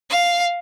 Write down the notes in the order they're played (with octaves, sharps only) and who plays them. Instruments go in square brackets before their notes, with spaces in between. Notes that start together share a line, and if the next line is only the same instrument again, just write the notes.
[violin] F5